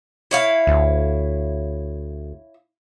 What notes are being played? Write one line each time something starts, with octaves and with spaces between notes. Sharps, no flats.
E4 C#5 F5
D2